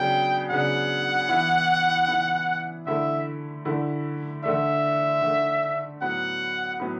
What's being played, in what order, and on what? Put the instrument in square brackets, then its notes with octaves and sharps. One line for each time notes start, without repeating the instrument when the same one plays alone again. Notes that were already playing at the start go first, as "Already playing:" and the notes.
Already playing: [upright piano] C#3 F#3 B3 D4 [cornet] G5
[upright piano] C#3 F#3 B3 D4 [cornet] F#5
[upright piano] E3 B3 E4
E3 B3 E4
[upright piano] D3 A3 E4 [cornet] E5
[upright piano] D3 A3 E4
[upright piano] D3 A3 D4 [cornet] E5
[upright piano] D3 A3 D4
[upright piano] A2 F#3 B3 [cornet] F#5
[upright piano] A2 F#3 B3